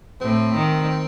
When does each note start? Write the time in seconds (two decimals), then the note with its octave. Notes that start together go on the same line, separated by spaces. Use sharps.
0.21 A2 C4
0.55 D#3